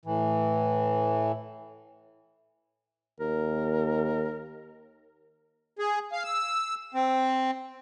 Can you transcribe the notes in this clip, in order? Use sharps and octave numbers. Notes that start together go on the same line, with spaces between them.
A2 E3
D#2 A#4
G#4
F5
E6
C4